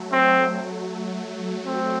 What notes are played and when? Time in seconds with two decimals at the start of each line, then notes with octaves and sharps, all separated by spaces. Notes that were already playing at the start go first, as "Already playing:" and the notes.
Already playing: F#3 A3
0.12 C4
1.66 C4